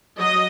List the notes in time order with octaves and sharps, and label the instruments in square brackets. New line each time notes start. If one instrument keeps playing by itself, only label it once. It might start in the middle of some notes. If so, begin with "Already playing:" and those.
[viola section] F#3 D#5